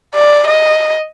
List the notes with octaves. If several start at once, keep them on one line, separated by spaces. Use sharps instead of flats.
D5
D#5